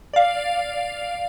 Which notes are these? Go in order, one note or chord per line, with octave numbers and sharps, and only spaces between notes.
D5 F5